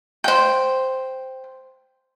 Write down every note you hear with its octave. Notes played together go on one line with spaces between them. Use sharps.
C5 G5